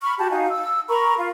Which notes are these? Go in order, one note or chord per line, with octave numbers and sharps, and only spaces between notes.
B5 C#6 F6
F#4 G4 A5
D#4 F#4 F5 G#5
E6
A#4 A#5 B5 C#6
F4